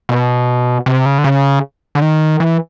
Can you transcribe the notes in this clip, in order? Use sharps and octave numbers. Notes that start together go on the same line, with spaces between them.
B2
C3
C#3
D3
C#3
D3
D#3
E3